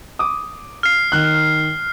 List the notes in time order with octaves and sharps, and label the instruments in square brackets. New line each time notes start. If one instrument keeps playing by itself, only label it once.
[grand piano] D6 D#6
[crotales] F6 C7
[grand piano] D#3 F#6